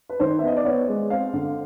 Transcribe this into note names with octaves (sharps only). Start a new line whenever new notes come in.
B4
D#3 C5
B3 E5
D#5
D5
B3 C#5
G#3
C4 F5
D3